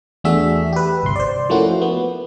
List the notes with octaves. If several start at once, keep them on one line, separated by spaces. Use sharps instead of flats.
E2 A3 D4 F#4 G#4 E5
G4 B4
G1 C2 C6
C5 D5
F3 A3 A#3 C#4 E4 F#4
B3